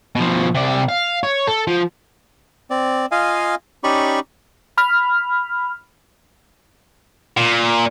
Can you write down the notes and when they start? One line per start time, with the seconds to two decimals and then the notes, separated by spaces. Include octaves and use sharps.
0.15 B2 F3
0.55 C3 D5
0.89 F5
1.23 C#5
1.47 A4
1.67 F3
2.70 C4 D5
3.12 F4 D#5 F5 G#5
3.84 C#4 D#4 G4 D5 B5 C#6
4.78 B5 F6
7.37 A#2